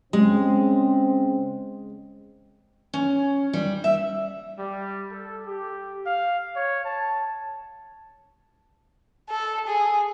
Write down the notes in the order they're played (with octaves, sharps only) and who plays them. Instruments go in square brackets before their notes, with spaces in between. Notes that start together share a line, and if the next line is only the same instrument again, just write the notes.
[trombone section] C#3 C4 [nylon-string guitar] G#3
[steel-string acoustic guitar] C#4
G3
E5
[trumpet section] G3
A4
G4
F5
C#5
A5
[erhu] A4
G#4